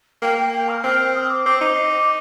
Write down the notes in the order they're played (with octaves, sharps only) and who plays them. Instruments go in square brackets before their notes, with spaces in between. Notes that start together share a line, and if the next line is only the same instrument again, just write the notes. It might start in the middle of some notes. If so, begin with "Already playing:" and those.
[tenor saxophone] A#3 [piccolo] G5
[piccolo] G5
G5
F6
[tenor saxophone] C4
[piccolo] D#6
D6
[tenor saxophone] C4 [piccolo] D6
[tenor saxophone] D#4